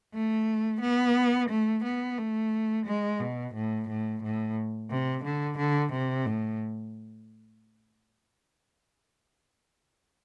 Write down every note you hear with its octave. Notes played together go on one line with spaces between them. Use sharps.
A3
B3
A3
B3
A3
G#3
B2
A2
A2
A2
C3
D3
D3
C3
A2